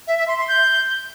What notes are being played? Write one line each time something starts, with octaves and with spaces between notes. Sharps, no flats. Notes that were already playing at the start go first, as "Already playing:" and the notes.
E5
E5
C6
C6
G6